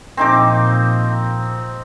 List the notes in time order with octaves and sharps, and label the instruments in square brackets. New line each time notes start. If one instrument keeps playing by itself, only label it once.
[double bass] A#2 F3 [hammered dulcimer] C4 D#4 D6